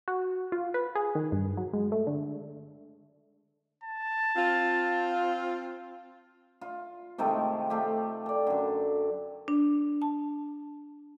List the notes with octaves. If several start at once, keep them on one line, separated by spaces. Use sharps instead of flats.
F#4
F4
B4
G#4
D#3
G2
F#3
G#3
A3
D3
A5
C4 F4
F4
C3 D#3 G#3 A3
A3 F4 G4
A4 D5
F#2 D3
D4
A5